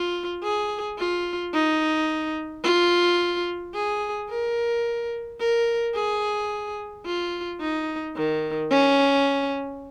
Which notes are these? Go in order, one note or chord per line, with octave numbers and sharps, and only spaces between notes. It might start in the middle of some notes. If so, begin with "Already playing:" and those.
Already playing: F4
G#4
F4
D#4
F4
G#4
A#4
A#4
G#4
F4
D#4
D#3
C#4